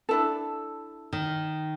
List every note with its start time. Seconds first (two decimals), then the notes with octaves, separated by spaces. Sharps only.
0.09 D4 E4 A4
1.13 D#3